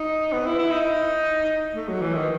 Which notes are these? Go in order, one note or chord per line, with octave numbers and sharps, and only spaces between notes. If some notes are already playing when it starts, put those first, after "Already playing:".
Already playing: D#4
B3
E4
E4
D#4
A3
F#3
E3
D#3